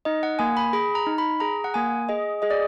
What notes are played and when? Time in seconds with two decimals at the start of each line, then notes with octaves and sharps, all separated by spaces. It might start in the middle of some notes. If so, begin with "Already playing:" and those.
0.05 D#4 D#5
0.23 F#5
0.39 A#3 G#5
0.57 B5
0.73 G#4 B5
0.95 A#5
1.06 D#4
1.18 B5
1.40 G#4 A#5
1.64 F#5
1.74 A#3 G#5
2.09 G#4 D#5
2.42 G#4 D#5
2.50 D5